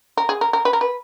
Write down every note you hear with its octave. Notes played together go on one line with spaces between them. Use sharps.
A#4
G#4
A#4
A#4
B4
A#4
B4